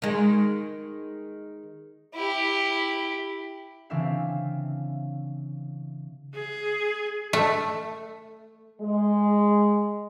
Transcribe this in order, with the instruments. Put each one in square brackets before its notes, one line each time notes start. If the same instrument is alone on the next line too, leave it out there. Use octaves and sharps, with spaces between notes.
[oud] D#3 G#3
[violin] E4 G4
[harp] C#3 E3 C4 D4 E5 F5
[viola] G#4
[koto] A3
[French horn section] G#3